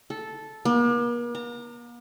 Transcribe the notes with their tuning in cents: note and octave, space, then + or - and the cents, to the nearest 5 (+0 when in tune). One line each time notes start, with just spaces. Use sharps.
A4 -10
A#3 +45
A#5 -25